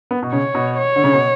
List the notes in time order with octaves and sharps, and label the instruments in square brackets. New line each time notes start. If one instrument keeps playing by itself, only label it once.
[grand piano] B3
B2
[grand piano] C#3 [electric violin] C#5
[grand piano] B2
[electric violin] C#5
[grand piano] D3
C#3
B2